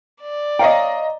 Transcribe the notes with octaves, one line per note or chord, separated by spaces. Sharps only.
D5
C#5 D#5 F5 G5 A#5